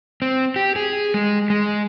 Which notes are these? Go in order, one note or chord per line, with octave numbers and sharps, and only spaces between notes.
C4
G4
G#4
G#3
G#3